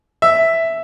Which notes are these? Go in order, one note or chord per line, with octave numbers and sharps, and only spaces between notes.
E5